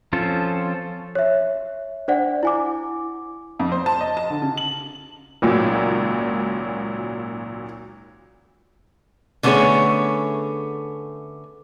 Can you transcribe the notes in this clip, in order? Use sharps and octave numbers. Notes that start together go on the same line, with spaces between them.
F3 C4 C#4 F4 A4
C#5 E5
D4 C5 D5 F#5
E4 G#5 D6
F2
C5
A5
D#5
A5
D3
C#3
F#7
G#1 C#2 A#2 F#3
D3 A3 B3 C#4 G#4 C#5